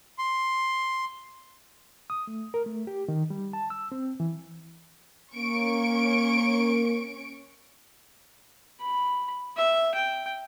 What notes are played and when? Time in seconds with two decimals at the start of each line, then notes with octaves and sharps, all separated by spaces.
0.19 C6
2.10 D#6
2.27 A3
2.54 A#4
2.66 A3
2.87 G4
3.08 D#3
3.30 G3
3.53 A5
3.70 E6
3.92 C4
4.20 E3
5.35 A#3 C#4 C#6 D7
8.81 B5
9.56 E5
9.95 G5